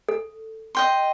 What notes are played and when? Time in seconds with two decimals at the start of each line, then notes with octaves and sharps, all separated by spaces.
0.09 A4
0.75 D#5 G5 C6